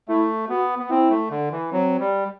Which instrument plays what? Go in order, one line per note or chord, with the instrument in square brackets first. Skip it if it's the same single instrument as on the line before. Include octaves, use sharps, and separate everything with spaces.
[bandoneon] A3 [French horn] E4
[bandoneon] B3 [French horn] F#4
[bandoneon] B3
[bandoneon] C4 [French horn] E4
[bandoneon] A3
D3
E3
[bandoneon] F#3 [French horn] C4
[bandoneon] G3